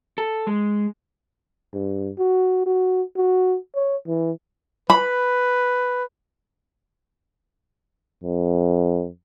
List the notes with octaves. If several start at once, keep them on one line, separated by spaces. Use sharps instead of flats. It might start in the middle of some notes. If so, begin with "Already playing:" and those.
A4
G#3
G2
F#4
F#4
F#4
C#5
E3
B4 B5
F2